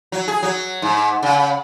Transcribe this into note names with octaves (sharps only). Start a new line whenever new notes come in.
F#3
G#4
F#3
G#2
C#3